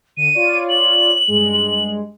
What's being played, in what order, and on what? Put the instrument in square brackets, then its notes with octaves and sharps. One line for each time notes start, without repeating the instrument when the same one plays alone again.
[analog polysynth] D3 [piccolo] D#7
[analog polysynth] F4 C#5 D5
[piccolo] F#7
[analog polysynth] G2 G#3